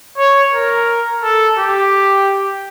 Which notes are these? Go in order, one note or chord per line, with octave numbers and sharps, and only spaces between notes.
C#5
A#4
A4
G4